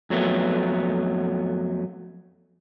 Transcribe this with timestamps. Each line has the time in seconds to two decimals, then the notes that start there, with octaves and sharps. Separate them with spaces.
0.10 F2 F#3 A3 B3